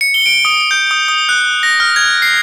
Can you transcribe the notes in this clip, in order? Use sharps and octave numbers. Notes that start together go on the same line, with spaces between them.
C#7
G7
D7
D#6
G6
D#6
D#6
F#6
A#6
F6
G#6
C7